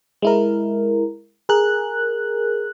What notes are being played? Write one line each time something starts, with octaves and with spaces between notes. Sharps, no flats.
G#3 E4 A#4
G#4 A#4 F#6